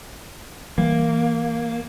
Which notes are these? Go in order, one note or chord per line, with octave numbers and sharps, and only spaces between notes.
E3 G3 A#3